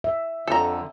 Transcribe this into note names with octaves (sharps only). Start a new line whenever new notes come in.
E5
F2 D3 A4 A#5